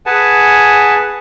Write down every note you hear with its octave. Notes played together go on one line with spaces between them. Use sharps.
G#4 B4 F#5 G#5 A5